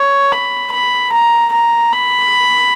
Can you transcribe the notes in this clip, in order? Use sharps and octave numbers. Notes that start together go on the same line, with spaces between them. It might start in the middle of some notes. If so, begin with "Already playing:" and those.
Already playing: C#5
B5
B5
A#5
A#5
B5